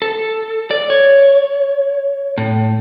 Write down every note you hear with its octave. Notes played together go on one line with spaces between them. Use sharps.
A4
D5
C#5
A2